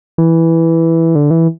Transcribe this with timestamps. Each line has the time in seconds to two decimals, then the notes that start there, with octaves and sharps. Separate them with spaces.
0.18 E3
1.15 D3
1.31 E3